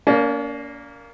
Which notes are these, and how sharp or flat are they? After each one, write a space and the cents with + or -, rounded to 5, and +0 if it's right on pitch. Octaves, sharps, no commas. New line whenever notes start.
A#3 +0 C#4 +45 D5 +0